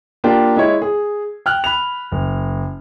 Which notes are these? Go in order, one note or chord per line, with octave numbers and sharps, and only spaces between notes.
A#3 D4 F4 G4
G#3 E4 C#5
G#4
G5 F6 F#6
B5 F#6 F7
F#1